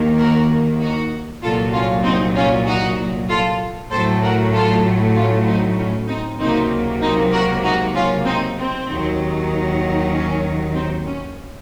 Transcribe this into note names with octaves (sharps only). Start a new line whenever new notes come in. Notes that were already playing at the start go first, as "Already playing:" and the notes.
Already playing: D#2 D#3 A#3
F#4 A#4
D#4 F#4
C2 A#2 F#3 F4 A4
C#4 F4
C4 D#4
C#4 F4
D#4 F#4
F4 A4
A2 F#3 A3 A4 C5
F#4 A#4
F4 A4
C#4 F4
C4 D#4
C#4
C4 D#4
C#2 C3 F#3 A#3 C4 D#4
C4 D#4
F#4 A#4
D#4 F#4
C#4 F4
C4 D#4
C4
D#2 D#3 F#3
C#4
C4 D#4
C#4